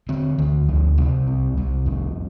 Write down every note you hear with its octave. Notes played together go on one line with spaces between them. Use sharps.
D3 C4
D2 D3
D2 F3
C3 G3
C2
C2
F2